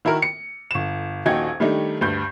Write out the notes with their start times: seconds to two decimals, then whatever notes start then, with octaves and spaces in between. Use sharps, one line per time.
0.05 D#3 E4 F#4 A#4
0.22 C#7
0.71 G1 E7
1.26 D#1 A#1 D#4 F#4 G5 G#6
1.60 D#3 G3 A3 D4 D#4
2.01 D2 G2 G6